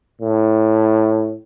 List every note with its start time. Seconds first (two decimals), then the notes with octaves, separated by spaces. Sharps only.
0.21 A2